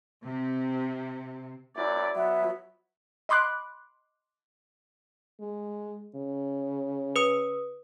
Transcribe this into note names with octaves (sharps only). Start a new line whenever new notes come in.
C3
F#2 E4 D5
F#3 B3 E5
D#5 B5 C6 D6 F#6
G#3
C#3
B4 D#6